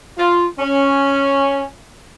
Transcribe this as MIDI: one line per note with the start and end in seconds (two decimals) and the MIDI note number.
0.17 0.46 65
0.58 1.67 61